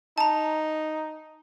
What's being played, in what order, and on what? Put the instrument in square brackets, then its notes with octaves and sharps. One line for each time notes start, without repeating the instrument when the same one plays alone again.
[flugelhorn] D#4 [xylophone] A5 A#5